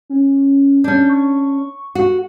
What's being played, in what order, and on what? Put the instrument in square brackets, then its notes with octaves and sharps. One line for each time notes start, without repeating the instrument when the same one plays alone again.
[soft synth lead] C#4
[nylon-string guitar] C#4 D4 [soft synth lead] G6
[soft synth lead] C#6
[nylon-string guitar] F#4